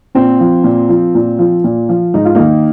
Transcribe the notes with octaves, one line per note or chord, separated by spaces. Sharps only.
A#2 C4
F3
A#2
F3
A#2
F3
A#2
F3
G#2 D#4
F4
D#3 A#3 D#4